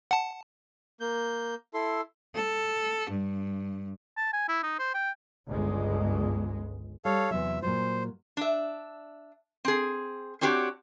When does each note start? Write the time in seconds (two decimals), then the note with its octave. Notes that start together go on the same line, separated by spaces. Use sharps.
0.11 F#5 A5
1.00 A#3 G6
1.74 E4 A4 C6
2.36 A4
3.10 G2
4.17 A5
4.33 G#5
4.48 E4
4.63 D#4
4.79 C5
4.94 G5
5.47 G1 C#2 G#3
7.05 G3 A4 C#5 F5
7.31 E2 C3 F#3 E5
7.62 A#2 F#3 F4 C5
8.37 D4 E5
9.65 C4 G#4
10.41 C4 D4 F#4 G4 C5 C#5